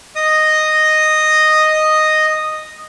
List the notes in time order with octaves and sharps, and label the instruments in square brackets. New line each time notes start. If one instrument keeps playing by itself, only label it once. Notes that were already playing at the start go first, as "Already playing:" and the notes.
[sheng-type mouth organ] D#5 D#6